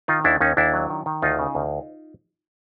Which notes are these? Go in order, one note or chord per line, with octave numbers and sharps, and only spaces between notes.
D#3 D#4 F4
D#2 D4 E4
D#2 C#4 D#4
D#2 D4 E4
F#3
D#3
D#3
D2 D#4 F4
C#3
D2